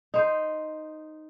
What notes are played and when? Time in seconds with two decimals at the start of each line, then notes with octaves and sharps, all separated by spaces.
0.14 D#4 C5